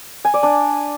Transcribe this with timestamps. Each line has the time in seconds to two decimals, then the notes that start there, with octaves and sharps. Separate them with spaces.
0.25 G#5
0.34 D5
0.43 D4